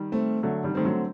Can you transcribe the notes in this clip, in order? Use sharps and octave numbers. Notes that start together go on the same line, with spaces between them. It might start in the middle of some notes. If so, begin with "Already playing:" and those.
Already playing: D#3 G3
A3 C4
D3 F#3 A3
D#3 G3
D#3 A3 C4
D3 F#3